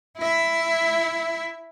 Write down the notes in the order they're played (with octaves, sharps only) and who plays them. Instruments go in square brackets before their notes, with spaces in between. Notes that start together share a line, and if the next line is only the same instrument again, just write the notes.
[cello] E4 E5